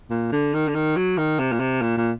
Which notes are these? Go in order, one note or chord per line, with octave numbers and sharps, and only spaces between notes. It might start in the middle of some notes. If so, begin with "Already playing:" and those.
A#2
D3
D#3
D3
D#3
F#3
D#3
C3
A#2
C3
A#2
A#2